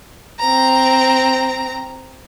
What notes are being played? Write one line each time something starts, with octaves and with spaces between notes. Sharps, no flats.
C4 A#5